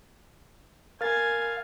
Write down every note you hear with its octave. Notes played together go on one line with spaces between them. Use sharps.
A#4 F5 G#5 A6